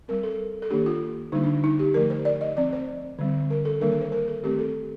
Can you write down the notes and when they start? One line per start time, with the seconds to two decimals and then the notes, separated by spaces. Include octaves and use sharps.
0.08 G3 C4 A#4
0.23 A4
0.62 A4
0.70 D#3 A#3 D4 G4
0.86 F4
1.32 D3 G3 A#3 D4 D#4
1.43 D4
1.64 D#4
1.79 G4
1.94 D3 F3 A3 A#4
2.10 C5
2.25 D5
2.41 D#5
2.57 F3 C4 D5
2.73 C5
3.19 D3 G3 C4
3.50 A#4
3.65 A4
3.80 D#3 G3 A#3 D4 A#4
3.91 A#4
4.01 C5
4.12 A#4
4.28 A4
4.43 D#3 A3 C4 G4
4.59 A4